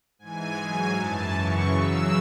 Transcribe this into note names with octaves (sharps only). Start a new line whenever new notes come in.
G#2 E3 G#5
G#2 F#3 G#5
F#2 E3 A5
F#2 C#3 E3 C#6
E2 C#3 F#3 E6